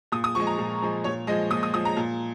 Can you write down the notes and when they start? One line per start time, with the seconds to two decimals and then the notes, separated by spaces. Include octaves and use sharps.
0.12 A#2 D#6
0.24 D#6
0.35 F3 G#3 C#6
0.47 A#5
0.58 A#2
0.82 F3 G#3
1.04 A#2 C#5
1.27 F3 G#3 D#5
1.51 A#2 D#6
1.63 D#6
1.74 F3 G#3 D#6
1.85 A#5
1.97 A#2